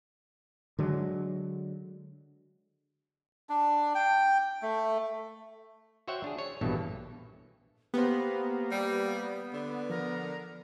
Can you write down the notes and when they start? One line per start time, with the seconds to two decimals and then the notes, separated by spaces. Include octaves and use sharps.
0.79 D3 F#3 G#3
3.49 D4
3.95 G5
4.62 A3
6.08 F#4 C5 C#5 E5 F#5 G5
6.24 D4 G#4
6.38 C#5
6.61 A#1 G2 B2 E3 A4
7.94 A#3 B3 G4 C5
8.72 G3
9.53 D3
9.90 F3 A#4